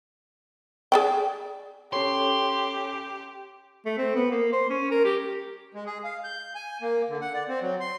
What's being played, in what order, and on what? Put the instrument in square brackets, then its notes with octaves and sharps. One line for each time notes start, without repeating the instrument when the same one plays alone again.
[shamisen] G#4 D5 G5
[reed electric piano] C#4 A4 C#5 [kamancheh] G4 [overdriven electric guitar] C6
[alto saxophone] A3
C4
B3
A#3
C5
C#4
A#4
G4
[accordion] G#3
G#4
F5
G6
G#5
A#3
D3
F#5
D5
C4
F#3
C6